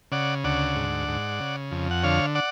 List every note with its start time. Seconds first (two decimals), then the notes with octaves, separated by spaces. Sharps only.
0.12 C#3 D5 F#5
0.44 D2 D5 F#5
0.76 G#2
1.08 G#2
1.40 C#3
1.72 F2
1.91 F#5
2.03 D3 C#5 F5
2.35 D5 F#5